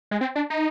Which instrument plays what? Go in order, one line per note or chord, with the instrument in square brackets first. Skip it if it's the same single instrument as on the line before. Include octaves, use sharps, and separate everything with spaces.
[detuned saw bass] G#3
C4
D4
D#4